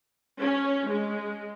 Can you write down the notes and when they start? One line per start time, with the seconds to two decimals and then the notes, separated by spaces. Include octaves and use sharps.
0.40 C#4
0.87 G#3